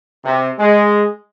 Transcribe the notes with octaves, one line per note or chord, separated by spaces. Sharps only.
C3
G#3